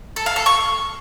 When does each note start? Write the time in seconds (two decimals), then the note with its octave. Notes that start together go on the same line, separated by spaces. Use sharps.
0.16 A4
0.26 F5
0.36 A4
0.46 C#6